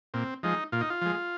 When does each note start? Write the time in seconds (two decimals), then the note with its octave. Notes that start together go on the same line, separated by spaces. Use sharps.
0.14 A#2 C4
0.43 F3 G#3 D#4
0.72 A#2 F4
0.81 D#4
0.90 F4
1.01 F3 G#3